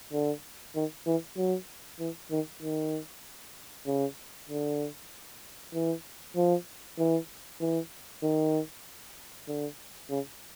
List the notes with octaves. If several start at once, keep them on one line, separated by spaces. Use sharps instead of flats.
D3
D#3
E3
F#3
E3
D#3
D#3
C#3
D3
E3
F3
E3
E3
D#3
D3
C#3